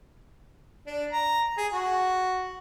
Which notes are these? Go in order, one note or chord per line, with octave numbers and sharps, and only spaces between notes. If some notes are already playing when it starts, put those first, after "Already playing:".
D4
A#5
G#4
F#4